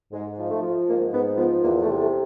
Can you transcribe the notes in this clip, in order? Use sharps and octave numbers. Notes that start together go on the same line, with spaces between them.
G#2 G#3
F3
A3
F3
G#2 A#3
G#2 B3
F3 B3
E2 A#3
A3
C3
A3